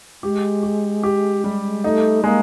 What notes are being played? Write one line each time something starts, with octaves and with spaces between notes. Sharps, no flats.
G#3 G4
G4
G4
G3
A3 D#4
G#3 A#3